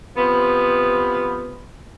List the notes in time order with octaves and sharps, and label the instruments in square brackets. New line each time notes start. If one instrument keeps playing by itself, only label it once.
[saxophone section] C3 F3 B3